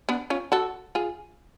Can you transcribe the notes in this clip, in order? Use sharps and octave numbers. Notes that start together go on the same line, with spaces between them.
B3 D4
C#4 F4
F#4 A4
F4 G#4